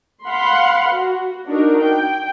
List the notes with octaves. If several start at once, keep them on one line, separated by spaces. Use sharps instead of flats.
F5 F#5 B5 C6
F#4
D4 D#4 F#4 A#4
G5